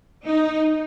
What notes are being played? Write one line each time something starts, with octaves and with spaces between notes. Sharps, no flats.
D#4